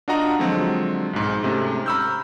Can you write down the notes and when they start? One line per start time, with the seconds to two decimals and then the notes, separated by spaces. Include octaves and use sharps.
0.08 D4 F4 F#4 D#5 F#5 A#5
0.39 D3 F3 F#3 G#3 C4
1.13 B1 G#2
1.43 G#2 C3 A3 C#4
1.86 A#5 B5 C#6 E6 F6 G6